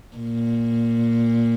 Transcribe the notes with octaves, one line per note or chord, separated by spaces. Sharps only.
A#2